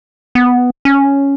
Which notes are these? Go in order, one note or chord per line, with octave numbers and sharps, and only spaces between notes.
B3
C#4